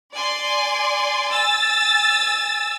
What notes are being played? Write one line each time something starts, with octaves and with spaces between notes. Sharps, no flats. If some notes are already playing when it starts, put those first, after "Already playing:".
D5 G#5 C6
G#5 E6 A6